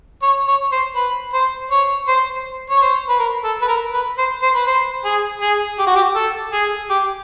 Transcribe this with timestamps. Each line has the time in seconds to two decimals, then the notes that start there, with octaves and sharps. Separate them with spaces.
0.22 C#5
0.48 C#5
0.72 C5
0.96 B4
1.34 C5
1.71 C#5
2.08 C5
2.70 C#5
2.82 C5
3.09 B4
3.19 A#4
3.44 A4
3.62 B4
3.68 A#4
3.93 B4
4.18 C5
4.42 C5
4.55 B4
4.67 C5
5.05 G#4
5.42 G#4
5.79 G4
5.87 F#4
5.96 G4
6.16 A4
6.53 G#4
6.90 G4